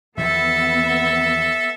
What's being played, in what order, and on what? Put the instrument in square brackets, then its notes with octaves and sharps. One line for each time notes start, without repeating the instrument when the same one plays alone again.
[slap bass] E2 D#3 F3 [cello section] B3 [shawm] A4 [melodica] E5